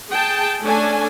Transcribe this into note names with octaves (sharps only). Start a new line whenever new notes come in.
G#4 G5 A5
A3 C#4 D4 G#5